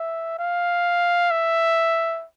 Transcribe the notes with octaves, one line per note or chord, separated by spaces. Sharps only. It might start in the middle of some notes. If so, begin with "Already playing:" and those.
Already playing: E5
F5
E5